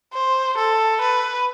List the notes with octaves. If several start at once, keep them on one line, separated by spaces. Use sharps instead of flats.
C5
A4
B4